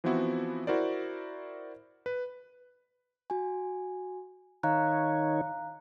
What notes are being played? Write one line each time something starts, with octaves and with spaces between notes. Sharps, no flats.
E3 F3 B3 C4 E4 F#4
E4 F#4 A#4 C5 D5
B4
F#4 G#5
D#3 D#4 C#5 F5 A#5 F#6